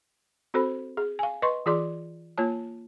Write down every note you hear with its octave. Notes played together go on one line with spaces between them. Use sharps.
C4 F#4 A4 C5 B5
G#4
F5 G#5
B4 D#5 C6 C#6
E3 F4 G#4 D5 C6 D6
A#3 F4 C#5 A5